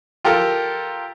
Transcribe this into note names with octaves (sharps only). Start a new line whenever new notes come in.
F4 G4 A4 A#4